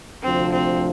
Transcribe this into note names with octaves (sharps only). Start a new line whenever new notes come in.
D2 C3 F3 C4
C4